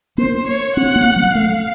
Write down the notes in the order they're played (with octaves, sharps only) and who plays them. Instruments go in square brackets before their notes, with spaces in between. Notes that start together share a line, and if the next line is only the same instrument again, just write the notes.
[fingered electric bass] A#3 [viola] C5
[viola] C#5
[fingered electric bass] C4 [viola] F#5
[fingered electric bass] A#3
F#3
[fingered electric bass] A3 [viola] F5